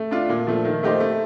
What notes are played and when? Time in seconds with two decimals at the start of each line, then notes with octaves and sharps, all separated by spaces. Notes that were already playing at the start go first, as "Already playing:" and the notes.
Already playing: A3
0.11 D4 F4
0.29 A#2
0.47 F3 A3
0.65 D#3
0.83 A3 D#4 G4 C5
1.00 A3